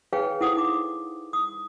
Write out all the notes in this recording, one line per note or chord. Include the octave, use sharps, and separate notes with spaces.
G#4 B4 C#5 F5 G5 G#5
E4 A4 C5 F#5 D#6
D#4 D6
D#6